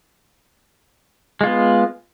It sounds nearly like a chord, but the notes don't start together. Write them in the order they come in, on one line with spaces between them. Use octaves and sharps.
G#3 F4 B3